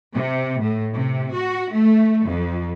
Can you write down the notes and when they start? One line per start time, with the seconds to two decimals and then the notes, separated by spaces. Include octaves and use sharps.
0.14 C3
0.61 A2
0.95 C3
1.36 F#4
1.74 A3
2.27 F2